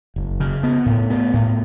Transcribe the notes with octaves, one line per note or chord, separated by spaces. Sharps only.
F#1
C#3
B3
A2
B3
A2